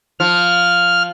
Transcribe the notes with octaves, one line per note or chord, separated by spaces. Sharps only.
F3 F6